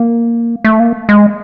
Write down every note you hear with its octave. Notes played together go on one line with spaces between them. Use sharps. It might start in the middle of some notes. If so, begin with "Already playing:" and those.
Already playing: A#3
A3
A#3
G#3